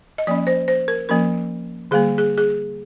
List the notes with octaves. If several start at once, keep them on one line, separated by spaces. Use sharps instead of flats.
D#5
F3 A#3 C#4 D5
C5
C5
A#4
F3 A#3 C#4 A#4
D3 G3 A#3 G#4
G#4
G#4